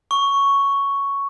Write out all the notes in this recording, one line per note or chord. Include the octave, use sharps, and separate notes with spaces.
C#6